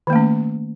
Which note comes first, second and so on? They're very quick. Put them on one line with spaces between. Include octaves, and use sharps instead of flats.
D#3 A#3 A3 C#4